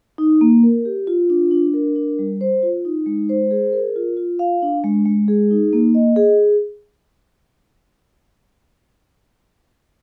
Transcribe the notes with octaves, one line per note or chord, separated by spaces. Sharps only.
D#4
A#3
A#4
G4
F4
D4
D4
A#4
D4
G3
C5
F4
D#4
G#3
C5
G#4
A#4
F4
F4
F5
D4
G#3
G#3
G#4
D#4
A#3
D#5
G#4